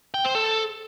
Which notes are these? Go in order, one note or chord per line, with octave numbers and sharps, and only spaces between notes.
G5
C5
A4